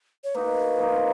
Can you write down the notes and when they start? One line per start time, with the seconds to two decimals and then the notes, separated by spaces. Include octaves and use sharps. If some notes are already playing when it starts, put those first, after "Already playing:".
0.24 C#5
0.35 A#3 D#4 F#4 B4
0.78 F3 A#3 D#4